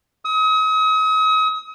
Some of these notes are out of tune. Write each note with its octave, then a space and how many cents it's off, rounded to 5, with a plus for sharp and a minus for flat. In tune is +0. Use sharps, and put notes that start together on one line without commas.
D#6 +40